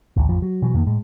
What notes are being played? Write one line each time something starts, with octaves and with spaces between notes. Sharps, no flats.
A1 D2
A1 F2 F3
F#3
B2 E3 F#3
F2 D#3 A#3
A2 G#3